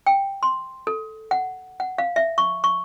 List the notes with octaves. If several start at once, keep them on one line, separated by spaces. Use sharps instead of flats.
G5
C6
A4
F#5
F#5
F5
E5
C#6
C#6